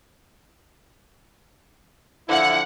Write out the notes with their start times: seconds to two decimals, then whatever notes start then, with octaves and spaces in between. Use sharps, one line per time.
2.29 D3 F3 E4 F#5